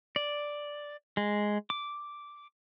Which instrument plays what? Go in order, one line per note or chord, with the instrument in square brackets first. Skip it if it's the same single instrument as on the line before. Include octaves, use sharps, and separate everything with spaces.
[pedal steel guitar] D5
G#3
D6